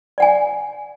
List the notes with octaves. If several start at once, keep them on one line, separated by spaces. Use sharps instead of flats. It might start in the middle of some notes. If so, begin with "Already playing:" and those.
D5 F#5 G#5